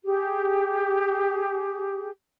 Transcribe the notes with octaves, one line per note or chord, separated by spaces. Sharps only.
G4 G#4